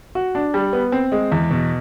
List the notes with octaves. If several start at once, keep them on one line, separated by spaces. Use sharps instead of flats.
F#4
D4
G3
B3
C4
G#3
E2
B2